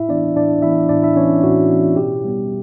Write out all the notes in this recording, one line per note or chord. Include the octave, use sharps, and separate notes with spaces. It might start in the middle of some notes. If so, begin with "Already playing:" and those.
Already playing: A2 E4 E5
E3 B3 D4 D5
A2 D4 D5
E3 B3 E4 E5
A2 D4 D5
E4 E5
E3 B3 C#4 C#5
A2 F#4
E3 B3
B2 G4
G3 B3